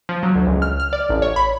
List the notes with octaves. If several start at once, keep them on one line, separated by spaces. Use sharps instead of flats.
F3
F#3
D2
C#2
F6
F6
D5
A1
C#5
B5